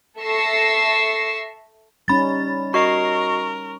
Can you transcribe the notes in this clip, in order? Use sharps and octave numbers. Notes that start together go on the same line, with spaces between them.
A4 E5 C#6 E6 A#6 C7
G3 C#4 D#4 B5 A6
F#4 A#4 D#5 C#6 C7